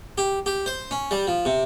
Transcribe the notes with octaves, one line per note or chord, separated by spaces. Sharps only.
G4
G4
C5
C#4
G3
F3
C3